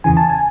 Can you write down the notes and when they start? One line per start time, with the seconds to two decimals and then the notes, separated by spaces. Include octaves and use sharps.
0.04 E2 C#3 E3 G#5
0.17 A5
0.29 G#5